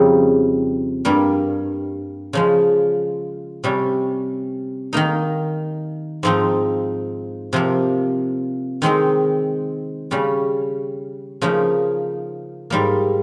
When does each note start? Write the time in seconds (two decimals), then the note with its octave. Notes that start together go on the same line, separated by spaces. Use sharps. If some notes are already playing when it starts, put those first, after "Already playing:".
Already playing: F2 C#3 G3 C4 D#4
1.05 G2 G3 A#3
2.33 C#3 F3 G#3
3.64 C3 G3 C#4
4.93 D#3 A#3 D#4
6.23 G#2 F3 C4 D#4
7.53 C3 F3 A#3
8.82 D#3 G#3 C4 D#4
10.11 C#3 G3 C#4
11.42 C#3 F3 A#3 D#4
12.70 G#2 G3 A#3